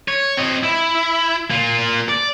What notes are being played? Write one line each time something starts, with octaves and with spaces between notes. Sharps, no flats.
C#5
C4 D#5
E4
A#3 F4
D5